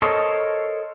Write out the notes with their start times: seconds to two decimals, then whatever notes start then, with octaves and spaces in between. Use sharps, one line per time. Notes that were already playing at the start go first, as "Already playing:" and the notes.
0.02 A4 A#4 C5 C#5 D#5